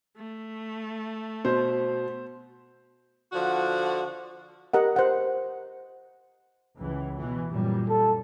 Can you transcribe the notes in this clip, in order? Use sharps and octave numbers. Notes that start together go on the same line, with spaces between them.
A3
B2 C5
D3 F3 F#4
G4 A#4 D#5 F#5
C5 F#5
C#2 E3
B2 E3
F#2 A#2 G3
A4